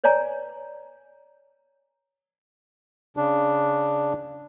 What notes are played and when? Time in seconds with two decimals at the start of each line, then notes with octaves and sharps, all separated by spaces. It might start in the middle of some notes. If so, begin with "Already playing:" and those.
0.04 B4 C#5 D5 G#5 A#5
3.17 C#3 D4